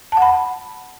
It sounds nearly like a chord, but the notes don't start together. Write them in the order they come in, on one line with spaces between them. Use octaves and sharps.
A5 F#5 B5